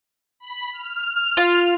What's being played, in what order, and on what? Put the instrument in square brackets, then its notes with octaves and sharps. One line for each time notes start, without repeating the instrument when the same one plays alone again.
[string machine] B5
F6
[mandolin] F4